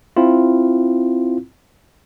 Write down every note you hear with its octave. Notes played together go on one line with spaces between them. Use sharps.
C4 E4 F4